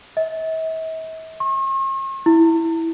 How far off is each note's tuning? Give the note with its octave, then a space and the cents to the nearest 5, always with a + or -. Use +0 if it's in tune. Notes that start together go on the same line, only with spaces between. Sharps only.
E5 -45
C#6 -45
E4 -5